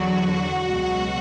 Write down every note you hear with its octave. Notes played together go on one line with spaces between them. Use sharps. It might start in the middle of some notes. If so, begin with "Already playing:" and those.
Already playing: E2 D3 F#3 F#4
C#2 B2 F#3